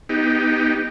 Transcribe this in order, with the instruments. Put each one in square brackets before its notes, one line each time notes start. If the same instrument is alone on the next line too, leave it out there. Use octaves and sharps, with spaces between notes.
[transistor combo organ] B3 D#4 G4